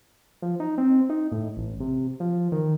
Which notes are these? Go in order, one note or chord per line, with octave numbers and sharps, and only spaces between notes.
F3
D#4
C4
D#4
A2
A1
C3
F3
D#3